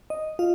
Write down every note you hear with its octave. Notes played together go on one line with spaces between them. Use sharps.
D#5
F4 F5